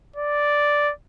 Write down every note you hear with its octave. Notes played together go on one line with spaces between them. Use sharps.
D5